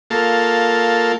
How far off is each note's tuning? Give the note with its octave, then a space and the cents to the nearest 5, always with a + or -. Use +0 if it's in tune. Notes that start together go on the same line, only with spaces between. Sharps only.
A#3 +0 F4 +10 A4 +0